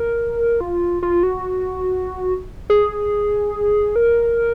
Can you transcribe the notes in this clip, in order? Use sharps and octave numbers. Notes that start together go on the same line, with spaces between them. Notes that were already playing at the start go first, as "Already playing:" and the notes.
Already playing: A#4
F4
F4
F#4
G#4
A#4